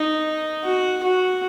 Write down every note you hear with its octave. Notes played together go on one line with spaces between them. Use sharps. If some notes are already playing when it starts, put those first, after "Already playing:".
Already playing: D#4
F#4
F#4